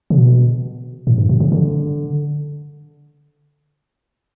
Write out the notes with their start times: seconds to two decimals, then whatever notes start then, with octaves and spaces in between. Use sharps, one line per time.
0.10 C#3
0.17 B2
1.07 A2
1.18 G2
1.29 B2
1.40 C#3
1.52 D3